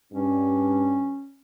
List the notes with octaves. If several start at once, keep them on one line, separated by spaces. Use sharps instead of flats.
G2 C#4